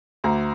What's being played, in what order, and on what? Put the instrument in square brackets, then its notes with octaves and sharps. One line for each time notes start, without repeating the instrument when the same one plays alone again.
[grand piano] D2 A#5